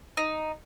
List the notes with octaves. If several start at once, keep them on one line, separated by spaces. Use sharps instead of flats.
D#4